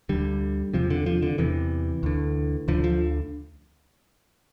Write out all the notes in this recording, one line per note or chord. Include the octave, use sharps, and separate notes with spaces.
D2 D3 G3
E2 C3 F3
D3
F3
D3
E2 C3 E3
D2 D3
D2 D3 F3
F3